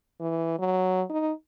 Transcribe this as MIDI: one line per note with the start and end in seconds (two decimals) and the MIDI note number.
0.20 0.55 52
0.58 1.02 54
1.10 1.31 63